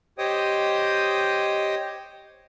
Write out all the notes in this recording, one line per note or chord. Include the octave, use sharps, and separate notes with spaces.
G4 C5 C#5 D#5 G5 D#6